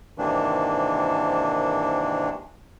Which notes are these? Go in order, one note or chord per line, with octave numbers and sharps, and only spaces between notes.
G#2 C3 D#3 E3 A#3 D4